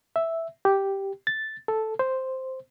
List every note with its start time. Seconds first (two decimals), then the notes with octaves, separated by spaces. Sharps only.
0.16 E5
0.65 G4
1.27 A6
1.68 A4
1.99 C5